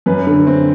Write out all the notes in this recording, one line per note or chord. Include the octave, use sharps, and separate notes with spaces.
F#2 B4
D3
C4